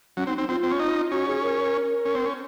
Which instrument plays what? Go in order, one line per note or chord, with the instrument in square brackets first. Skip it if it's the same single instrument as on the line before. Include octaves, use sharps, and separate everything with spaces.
[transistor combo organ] F#3 [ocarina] C#4
[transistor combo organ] C4 [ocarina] D#4
[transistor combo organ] C4 [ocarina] D#4
[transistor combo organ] C4 [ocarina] F4
[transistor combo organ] C4
C#4
D#4
[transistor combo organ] C#4 [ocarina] F#4
[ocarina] G#4
A#4
[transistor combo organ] C#4
C4
C#4